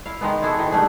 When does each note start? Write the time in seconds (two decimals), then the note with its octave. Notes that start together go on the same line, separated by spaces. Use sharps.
0.05 E4 F5
0.21 D#3 G#3 B3
0.42 E4 F#4 G#4 A4
0.59 D#3 E3
0.71 G2 A3 D4 G#4